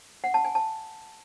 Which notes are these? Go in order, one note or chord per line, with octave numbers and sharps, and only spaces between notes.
F#5
A5
G#5
A5